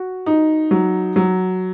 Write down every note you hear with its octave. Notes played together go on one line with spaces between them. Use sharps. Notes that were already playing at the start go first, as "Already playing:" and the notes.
Already playing: F#4
D#4
F#3
F#3